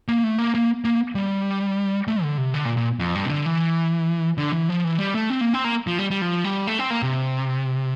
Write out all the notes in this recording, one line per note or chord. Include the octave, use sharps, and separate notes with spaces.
A#3
A3
A#3
A#3
A#3
G3
A3
D3
C3
D3
A#2
A#2
F2
G2
C3
D3
E3
D3
E3
F3
E3
G3
A3
C4
A#3
C4
A#3
F3
G3
G3
F3
G3
A3
C4
A#3
C3